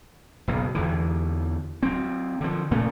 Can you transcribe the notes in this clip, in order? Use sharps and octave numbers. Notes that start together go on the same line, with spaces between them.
F#1 B1
E2 D3 E3
F#3 C4
D3 F3
A#2 C#3 A3